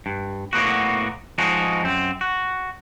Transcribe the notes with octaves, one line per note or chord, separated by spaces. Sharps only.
G2
A2 A#3 B3 F#4
F3 G#3 D#4 F#4
F#2 C4
F#4